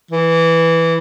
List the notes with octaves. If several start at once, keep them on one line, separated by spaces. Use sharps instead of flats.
E3